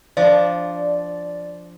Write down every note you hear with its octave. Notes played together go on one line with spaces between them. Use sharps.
F3 D4 D5